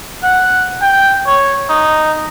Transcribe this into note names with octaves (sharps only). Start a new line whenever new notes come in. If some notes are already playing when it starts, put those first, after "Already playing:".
F#5
G5
C#5
D#4